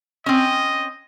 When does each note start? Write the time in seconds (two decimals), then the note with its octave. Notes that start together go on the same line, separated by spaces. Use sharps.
0.26 C4 C#4 D#5